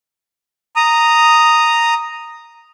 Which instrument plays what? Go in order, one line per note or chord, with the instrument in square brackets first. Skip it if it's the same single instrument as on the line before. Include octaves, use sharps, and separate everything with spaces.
[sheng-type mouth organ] A#5 D#6